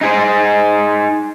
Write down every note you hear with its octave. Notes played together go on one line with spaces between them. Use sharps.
D#4 G#4 C5